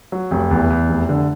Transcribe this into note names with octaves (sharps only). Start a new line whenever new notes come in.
F#3
F1
E2
E2
F1
D3